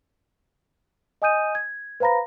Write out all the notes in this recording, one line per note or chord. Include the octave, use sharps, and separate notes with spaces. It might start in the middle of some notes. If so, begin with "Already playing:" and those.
D#5 G#5 D#6 G6 D#7
G#6
B4 C5 F5 A#5 B5 A#6